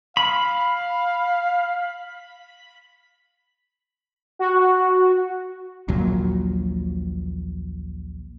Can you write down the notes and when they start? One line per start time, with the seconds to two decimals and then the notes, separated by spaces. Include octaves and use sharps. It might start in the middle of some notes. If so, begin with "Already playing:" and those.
0.17 F5 B5
4.39 F#4
5.88 A#1 D#2 A#2 F#3